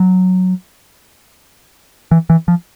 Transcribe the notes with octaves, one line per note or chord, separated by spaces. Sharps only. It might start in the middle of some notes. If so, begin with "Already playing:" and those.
Already playing: F#3
E3
E3
F3